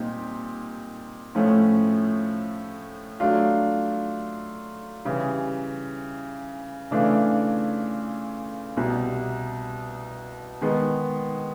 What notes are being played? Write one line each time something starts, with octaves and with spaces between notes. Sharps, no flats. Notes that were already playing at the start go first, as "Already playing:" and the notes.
Already playing: A#2 G3 C4 D#4 G4
A2 F3 A3 C#4
F#3 A3 D4 F4
C#3 E3 G3
C#3 E3 A3 D4 F4
C2 B2 G3
D#3 G#3 B3